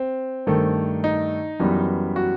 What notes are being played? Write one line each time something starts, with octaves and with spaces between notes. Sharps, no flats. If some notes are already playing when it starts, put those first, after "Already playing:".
Already playing: C4
G2 D#3 A3
D#4
F#2 E3 G3 B3
F#4